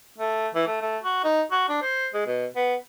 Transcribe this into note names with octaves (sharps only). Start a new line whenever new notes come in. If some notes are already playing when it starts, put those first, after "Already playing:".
A3
E3
A3
A3
F#4
D#4
F#4
D4
C5
G#3
B2
B3